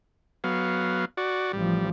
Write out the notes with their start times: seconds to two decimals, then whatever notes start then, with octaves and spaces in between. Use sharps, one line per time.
0.44 F#3 B3 F5
1.17 F#4 D5
1.53 A1 F3 G3